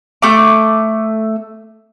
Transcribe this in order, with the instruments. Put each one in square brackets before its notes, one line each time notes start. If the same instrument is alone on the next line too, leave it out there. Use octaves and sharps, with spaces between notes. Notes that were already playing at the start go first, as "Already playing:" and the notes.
[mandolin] A3 D6